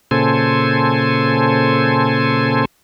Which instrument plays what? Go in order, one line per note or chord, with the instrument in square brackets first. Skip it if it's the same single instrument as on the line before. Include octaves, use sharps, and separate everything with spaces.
[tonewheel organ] A#2 C#3 A4 C5 G#5